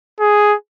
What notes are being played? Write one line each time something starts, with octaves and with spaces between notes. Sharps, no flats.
G#4